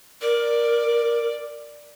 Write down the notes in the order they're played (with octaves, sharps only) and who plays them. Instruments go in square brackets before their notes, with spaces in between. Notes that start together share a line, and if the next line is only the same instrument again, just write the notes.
[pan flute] A#4 [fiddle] D5